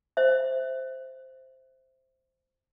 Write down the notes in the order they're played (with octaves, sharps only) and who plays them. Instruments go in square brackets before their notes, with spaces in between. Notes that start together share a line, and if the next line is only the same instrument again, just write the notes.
[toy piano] C5 E5